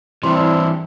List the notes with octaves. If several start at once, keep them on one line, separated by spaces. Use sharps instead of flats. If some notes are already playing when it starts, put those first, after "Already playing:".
E3 G3 C4 D4 E4 C6